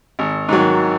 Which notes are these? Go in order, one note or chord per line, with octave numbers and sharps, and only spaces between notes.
G#1
G#2 D#3 F#3